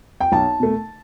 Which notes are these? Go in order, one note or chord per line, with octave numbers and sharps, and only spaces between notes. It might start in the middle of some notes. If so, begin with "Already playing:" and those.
G5
B1 A5
B2 A3